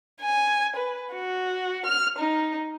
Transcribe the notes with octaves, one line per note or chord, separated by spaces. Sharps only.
G#5
B4
F#4
F6
D#4